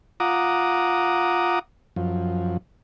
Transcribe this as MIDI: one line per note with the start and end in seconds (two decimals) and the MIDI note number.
0.20 1.59 65
0.20 1.59 78
0.20 1.59 82
0.20 1.59 86
0.20 1.59 87
1.96 2.57 42
1.96 2.57 53